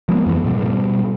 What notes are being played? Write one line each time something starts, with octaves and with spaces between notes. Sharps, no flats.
F3 G#3 A#3 B3
F2 E3 A#3 B3
G#2 B2 G3
B2 G3